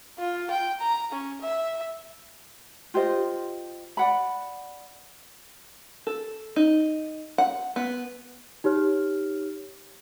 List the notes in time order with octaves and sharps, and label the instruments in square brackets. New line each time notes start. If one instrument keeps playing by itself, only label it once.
[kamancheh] F4
G5
A#5
C#4
E5
[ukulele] F4 G4 C5 D#5
D5 F#5 B5
[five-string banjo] A4
D#4
F#5
B3
[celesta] D#4 G4 C#5 F6